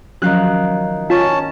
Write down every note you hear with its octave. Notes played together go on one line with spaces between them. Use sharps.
D#3 F3 F#3 C#4 F5 F#6
C#4 F4 A5